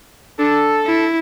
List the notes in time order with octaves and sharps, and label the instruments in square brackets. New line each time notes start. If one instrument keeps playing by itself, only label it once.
[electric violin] D4 [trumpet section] A4
[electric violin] E4